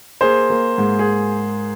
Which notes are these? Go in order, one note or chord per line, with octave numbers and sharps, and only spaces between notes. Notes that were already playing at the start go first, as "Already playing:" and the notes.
A#3 G#4 C5
A#3
G#2
G#4